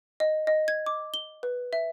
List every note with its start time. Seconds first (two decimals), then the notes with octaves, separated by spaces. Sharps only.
0.20 D#5
0.47 D#5
0.68 G#6
0.86 D6
1.14 G7
1.43 B4
1.73 E5